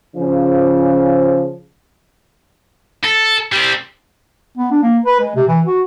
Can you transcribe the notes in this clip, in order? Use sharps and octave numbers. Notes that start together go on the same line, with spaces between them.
C#3 F3
A4
G3 C4
B3
D4
A#3
B4
G#3
C3
E3
F#4